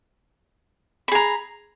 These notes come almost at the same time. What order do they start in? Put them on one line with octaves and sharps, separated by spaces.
B5 G#4 A#5